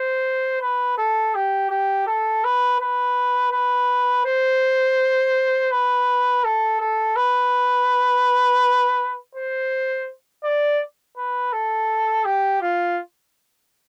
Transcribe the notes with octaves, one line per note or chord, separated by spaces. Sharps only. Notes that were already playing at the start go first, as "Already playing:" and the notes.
Already playing: C5
B4
A4
G4
G4
A4
B4
B4
B4
C5
B4
A4
A4
B4
C5
D5
B4
A4
G4
F4